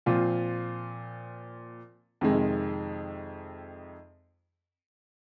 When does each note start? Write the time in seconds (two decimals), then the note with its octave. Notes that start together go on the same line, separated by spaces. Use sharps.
0.06 A#2 F3 C4 F4
2.21 F2 C3 D#3 G#3